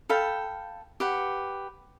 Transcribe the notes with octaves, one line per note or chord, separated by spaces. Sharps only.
A4 F5 G5 B5
G4 B4 F#5